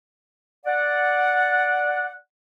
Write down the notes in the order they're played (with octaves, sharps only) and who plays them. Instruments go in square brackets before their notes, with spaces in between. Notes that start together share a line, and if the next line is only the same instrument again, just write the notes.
[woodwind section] D5 F#5